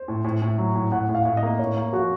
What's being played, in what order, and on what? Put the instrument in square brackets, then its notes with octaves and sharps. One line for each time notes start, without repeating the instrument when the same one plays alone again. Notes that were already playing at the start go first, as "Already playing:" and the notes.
Already playing: [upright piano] C5
[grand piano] A2
A2
A2
F#3
A2
[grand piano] A2 [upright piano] F#5
[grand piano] A2
[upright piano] F5
[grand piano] A2
[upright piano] D#5
[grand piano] A#3
[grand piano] A2 [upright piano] C#5
[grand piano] A#3
[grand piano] F3 [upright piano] F#4